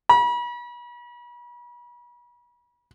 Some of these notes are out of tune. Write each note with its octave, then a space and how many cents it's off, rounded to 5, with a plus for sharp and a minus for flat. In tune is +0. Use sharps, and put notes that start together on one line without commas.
B5 -40